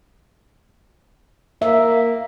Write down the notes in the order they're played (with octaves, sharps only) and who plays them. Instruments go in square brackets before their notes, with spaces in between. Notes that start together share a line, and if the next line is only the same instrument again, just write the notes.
[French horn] A#3 [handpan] E5